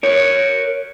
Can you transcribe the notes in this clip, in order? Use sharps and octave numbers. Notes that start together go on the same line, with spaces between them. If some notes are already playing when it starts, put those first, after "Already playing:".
A#4 C#5